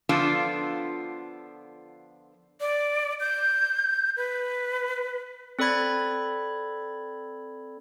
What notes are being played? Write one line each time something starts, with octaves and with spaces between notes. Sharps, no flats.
D3 F3 B3 D4 F4 A4
D5
G6
B4
C4 A4 D5 B5 G#6